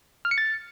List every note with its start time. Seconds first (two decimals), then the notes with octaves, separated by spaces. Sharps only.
0.25 F6
0.31 C#7
0.38 A6